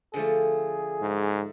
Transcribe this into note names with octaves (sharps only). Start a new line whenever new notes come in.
D3 F3 A3 G#4
G#2